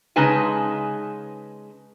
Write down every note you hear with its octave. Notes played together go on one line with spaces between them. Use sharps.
C#3 G#3 D#4 B4 G#5 A5